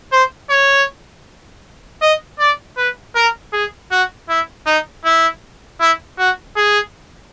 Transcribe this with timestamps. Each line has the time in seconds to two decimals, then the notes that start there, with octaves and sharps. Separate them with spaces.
0.12 C5
0.50 C#5
2.02 D#5
2.39 D5
2.77 B4
3.16 A#4
3.53 G#4
3.91 F#4
4.29 E4
4.66 D#4
5.05 E4
5.80 E4
6.18 F#4
6.56 G#4